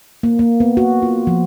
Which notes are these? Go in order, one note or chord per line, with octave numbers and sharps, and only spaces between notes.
A#3
A#3
B3
F#4
F4
F3